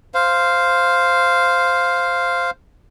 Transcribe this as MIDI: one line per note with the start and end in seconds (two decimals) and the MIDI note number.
0.14 2.51 72
0.14 2.51 77